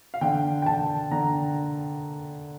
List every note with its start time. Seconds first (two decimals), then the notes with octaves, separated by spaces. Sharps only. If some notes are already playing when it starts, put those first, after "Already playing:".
0.14 F5
0.21 D3 G5
0.62 G5
0.66 D3 A5
1.11 D3 A#5